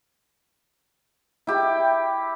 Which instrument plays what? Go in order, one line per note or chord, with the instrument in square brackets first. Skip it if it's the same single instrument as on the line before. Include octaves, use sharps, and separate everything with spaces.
[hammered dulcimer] E4 G4 G5